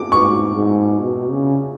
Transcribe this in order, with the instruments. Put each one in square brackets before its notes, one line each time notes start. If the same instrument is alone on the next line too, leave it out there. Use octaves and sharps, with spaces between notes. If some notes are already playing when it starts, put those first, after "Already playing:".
Already playing: [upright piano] D6
[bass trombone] G#2 [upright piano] C#6
[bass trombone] G#2
B2
C#3